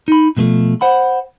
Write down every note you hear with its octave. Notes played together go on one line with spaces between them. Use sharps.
D#4 B5
B2 F3 G#3 A3
C5 F#5 B5